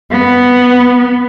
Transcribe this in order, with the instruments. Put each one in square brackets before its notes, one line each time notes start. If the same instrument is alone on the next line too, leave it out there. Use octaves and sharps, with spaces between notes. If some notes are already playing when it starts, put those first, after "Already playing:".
[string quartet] B3